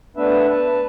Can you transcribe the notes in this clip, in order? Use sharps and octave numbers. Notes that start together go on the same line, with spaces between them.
A3 B3 D4 B4 E5
B4 A5